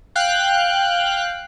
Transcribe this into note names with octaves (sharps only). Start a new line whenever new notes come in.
F5 G5 F#6